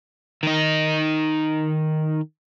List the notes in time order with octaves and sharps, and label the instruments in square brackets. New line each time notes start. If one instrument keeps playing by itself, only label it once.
[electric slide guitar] D#3 D#4